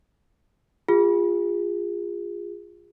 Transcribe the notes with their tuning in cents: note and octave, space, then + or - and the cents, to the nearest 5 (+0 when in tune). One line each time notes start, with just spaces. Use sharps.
F4 +0 G#4 -30